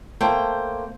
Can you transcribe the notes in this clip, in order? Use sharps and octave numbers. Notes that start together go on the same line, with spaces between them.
A3 A#3 C5 G5